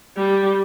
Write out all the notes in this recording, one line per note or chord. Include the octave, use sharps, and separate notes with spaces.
G3